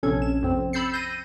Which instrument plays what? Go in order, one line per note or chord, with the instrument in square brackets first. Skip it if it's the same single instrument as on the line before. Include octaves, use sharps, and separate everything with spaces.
[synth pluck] A#1 C3 C#4 A4 G#6
E7
F2 C4
B5 E6 G6 A6 C7 C#7
G6 A#6 D#7